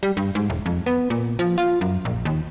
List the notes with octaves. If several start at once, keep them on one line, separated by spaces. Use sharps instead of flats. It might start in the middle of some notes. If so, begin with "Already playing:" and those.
G3
G2
G#2
E1
F2
B3
A#2
F3
F4
F#2
A#1
D#2